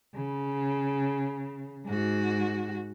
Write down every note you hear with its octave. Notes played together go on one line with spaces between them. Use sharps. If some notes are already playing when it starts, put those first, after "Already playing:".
C#3
G#2 F#4